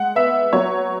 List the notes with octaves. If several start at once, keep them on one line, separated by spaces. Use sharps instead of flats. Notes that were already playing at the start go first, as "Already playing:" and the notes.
Already playing: G#3 F#5
B3 E5
F#3 C#5